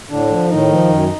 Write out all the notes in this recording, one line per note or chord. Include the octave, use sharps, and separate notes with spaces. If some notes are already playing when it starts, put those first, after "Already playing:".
A2 D3 D4
F3
A2 D#3 D#4
F3
F#2